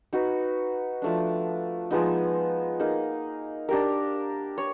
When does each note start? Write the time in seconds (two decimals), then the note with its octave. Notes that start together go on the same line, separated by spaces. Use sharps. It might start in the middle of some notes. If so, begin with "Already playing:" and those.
0.13 D#4 F#4 B4
1.02 F3 A3 D4
1.91 F3 G#3 B3 D#4
2.80 A#3 D#4 G#4
3.69 D4 G4 A#4
4.58 C#5